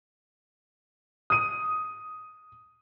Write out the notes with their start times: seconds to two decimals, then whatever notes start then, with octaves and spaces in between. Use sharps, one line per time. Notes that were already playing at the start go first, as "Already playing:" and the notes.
1.30 D#6 D#7